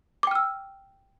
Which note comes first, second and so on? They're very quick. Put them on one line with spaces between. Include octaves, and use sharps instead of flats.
D6 G5 F6 E6